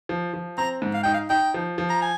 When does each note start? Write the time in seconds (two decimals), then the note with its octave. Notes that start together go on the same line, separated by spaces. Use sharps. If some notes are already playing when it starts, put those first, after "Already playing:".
0.09 F3
0.33 F3
0.58 C4 A#5
0.82 G#2
0.94 F5
1.03 D#4 G5
1.14 F5
1.30 D#4 G5
1.54 F3
1.78 F3
1.89 A#5
2.02 G#5